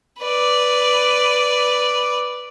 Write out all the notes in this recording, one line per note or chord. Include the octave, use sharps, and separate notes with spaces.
B4 D5